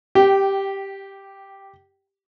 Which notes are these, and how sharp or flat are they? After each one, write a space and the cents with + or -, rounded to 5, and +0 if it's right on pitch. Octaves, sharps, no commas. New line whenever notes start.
G4 +0 G5 -20